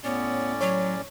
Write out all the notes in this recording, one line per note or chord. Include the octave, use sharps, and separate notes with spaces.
A2 B3 C#4 D5
F#3 C#5